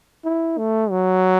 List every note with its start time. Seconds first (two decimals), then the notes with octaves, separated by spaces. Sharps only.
0.25 E4
0.58 A3
0.91 F#3